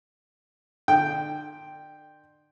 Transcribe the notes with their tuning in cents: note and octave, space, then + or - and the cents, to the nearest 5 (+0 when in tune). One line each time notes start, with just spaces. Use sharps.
D3 +35 G5 +0